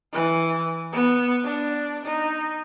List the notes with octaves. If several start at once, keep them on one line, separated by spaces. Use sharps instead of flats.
E3
B3
D4
D#4